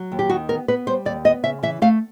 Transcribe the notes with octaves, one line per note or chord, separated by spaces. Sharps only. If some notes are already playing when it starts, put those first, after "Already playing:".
Already playing: F#3
D#2
G4
D#3 F#4
B3 A#4
B3 B4
G3 C5
D#2 D5
B3 D#5
C#3 E5
E3 E5
A3 F5